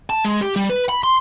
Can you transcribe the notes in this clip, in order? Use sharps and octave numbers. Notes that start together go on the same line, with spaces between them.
A5
G#3
G4
G3
B4
B5
C6